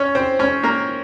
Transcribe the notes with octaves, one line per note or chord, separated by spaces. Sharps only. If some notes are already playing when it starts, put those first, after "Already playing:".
Already playing: C#4 C#5
C4 C5
C#4 C#5
A#3 A#4